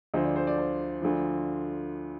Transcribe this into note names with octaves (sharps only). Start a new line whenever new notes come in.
D2 D3 F3 C5 D#5
D5
C5
D5
C5
D2 D3 F3